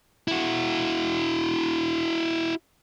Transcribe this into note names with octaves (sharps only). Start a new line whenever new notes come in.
E4 F#4